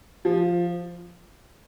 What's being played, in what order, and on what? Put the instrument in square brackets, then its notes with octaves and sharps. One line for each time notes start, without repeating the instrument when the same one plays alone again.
[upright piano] F3